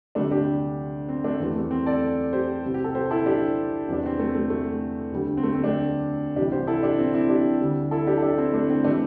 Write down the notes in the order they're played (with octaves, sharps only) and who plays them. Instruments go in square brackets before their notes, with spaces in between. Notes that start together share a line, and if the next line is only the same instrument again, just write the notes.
[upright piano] D2 C3 G3 A3 D4
D4 G4
C4
A3 D4
E2 E3 G3 C4
A3
C4
A4 D5
G4 C5
C2 C3 G3
G4
A4
G4 C5
E4 A4
D4 G4
E2 C3 G3 D4
C4
A3
A3
A3
D2 D3 G3
C4
A3
C4
A3 D4
C2 C3 E3 G3 D4 G4
G4 C5
E4 A4
D4 G4
C4 E4
C4 E4
D4 G4
D2 D3 G3
E4 A4
D4 G4
A4
D4 G4
C4 E4
A3 D4
C4
A3 D4
E3 G3